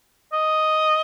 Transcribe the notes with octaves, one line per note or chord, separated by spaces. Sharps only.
D#5